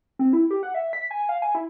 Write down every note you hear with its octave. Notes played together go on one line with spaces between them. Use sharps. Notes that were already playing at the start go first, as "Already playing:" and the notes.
C4
E4
G4
F#5
E5
B6
G#5
F5
G#5
E4